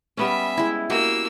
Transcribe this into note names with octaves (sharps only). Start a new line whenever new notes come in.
G3 B3 C#4 E5
G#3 E4
A#3 F#4 G4 E6